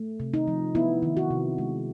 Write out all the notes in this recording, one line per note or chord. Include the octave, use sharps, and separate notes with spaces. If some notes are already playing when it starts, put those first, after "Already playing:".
Already playing: A3
C3
D#4
F3
B3 E4
D#3
F#4
C3
G#3